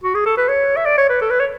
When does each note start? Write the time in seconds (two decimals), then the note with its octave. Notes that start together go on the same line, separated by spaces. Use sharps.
0.04 F#4
0.15 G#4
0.26 A4
0.37 B4
0.48 C#5
0.77 E5
0.85 D5
0.98 C#5
1.09 B4
1.21 A4
1.31 B4
1.40 C#5